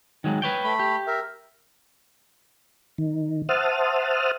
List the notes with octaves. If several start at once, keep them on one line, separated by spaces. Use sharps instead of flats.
D#3 F#3 G#3
B4 C#5 G5
A3 B5
G4
A#4 E5
D#3
C5 E5 F#5 A5 D#6 F6